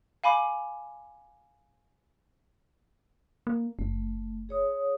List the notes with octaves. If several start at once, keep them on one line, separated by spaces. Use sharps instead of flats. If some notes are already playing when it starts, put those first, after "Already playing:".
F5 G#5 B5 D6
A#3
F#1 A3
G#4 C#5 D#6